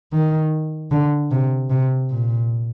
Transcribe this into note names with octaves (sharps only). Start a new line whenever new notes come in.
D#3
D3
C3
C3
A#2